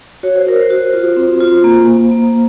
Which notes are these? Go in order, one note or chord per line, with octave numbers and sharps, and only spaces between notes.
F#4 C#5
C5
F#4 A#4
C5
F#4
F4
C4
F4
A#3
A#3
A#3